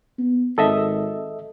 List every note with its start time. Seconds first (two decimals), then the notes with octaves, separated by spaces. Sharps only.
0.19 B3
0.58 G#1 A4 D#5 E5